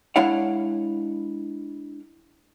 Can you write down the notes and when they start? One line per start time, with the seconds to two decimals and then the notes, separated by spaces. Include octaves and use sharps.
0.16 G#3 D4 E4 C#5 F5 F#5